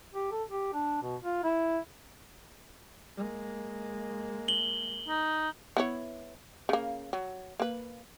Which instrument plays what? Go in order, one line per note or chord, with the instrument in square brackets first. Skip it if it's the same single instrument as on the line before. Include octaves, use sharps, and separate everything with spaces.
[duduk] G4
A4
G4
D4
B2
F4
E4
[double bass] G#3 A#3
[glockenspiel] F#7 G7
[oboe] D#4
[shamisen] B3 E4 C#5
C#3 A#3
F#3
A#3 B4